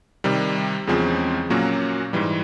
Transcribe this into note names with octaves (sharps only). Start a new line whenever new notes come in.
C3 D#3 G3
E2 C#3 F3 G#3 C4
A#2 F#3 A#3 C#4 F#4
G#2 E3 G3